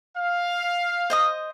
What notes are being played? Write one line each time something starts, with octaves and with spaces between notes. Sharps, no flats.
F5
C5 D#5 D#6